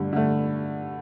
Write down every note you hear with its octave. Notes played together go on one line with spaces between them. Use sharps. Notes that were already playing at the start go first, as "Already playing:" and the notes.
Already playing: G2 D3 A3
D3 A3